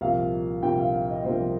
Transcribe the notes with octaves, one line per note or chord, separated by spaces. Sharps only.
C2 A#2 F3 A#3 F5
C2 A#2 F3 A#3 G5
F5
F5
D#5
C2 A#2 F3 A#3 C5